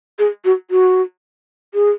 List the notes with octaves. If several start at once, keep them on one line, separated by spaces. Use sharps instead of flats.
G#4
F#4
F#4
G#4